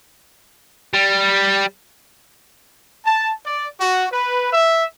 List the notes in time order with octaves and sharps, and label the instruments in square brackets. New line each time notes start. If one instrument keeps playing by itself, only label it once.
[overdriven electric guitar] G3
[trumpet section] A5
D5
F#4
B4
E5